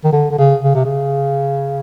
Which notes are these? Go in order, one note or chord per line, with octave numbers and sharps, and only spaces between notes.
D#3
D3
D3
C#3
C#3
C3
C#3